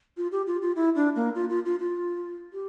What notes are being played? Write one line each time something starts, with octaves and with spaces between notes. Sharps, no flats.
F4
G4
F4
F4
E4
D4
A#3
F4
F4
F4
F4
G4